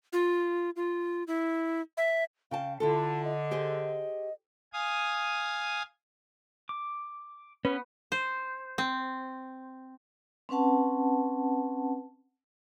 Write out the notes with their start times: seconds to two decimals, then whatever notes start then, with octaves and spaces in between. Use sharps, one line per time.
0.13 F4
0.76 F4
1.27 E4
1.97 E5
2.51 C#3 F5 G5 A5
2.80 D3 E4 F4 A4 A5
3.24 D#5
3.51 G4 G#4 C5
4.73 F5 G#5 D#6
6.69 D6
7.65 B3 C#4 B4
8.12 C5
8.78 C4
10.49 C4 C#4 B4 F#5 A5